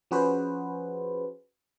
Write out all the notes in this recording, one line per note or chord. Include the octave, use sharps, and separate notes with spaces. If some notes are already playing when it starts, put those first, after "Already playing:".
F3 C#4 F#4 G#4 B4 C5